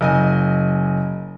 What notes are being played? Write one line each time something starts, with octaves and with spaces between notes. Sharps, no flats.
F#1 D#5 G#5